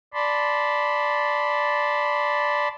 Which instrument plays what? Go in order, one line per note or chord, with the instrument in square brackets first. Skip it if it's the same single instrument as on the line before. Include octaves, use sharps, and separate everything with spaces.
[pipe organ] D5 A5 B5 C6